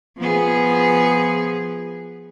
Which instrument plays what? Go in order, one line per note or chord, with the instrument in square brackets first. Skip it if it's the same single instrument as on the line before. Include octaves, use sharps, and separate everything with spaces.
[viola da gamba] F3 B3 G#4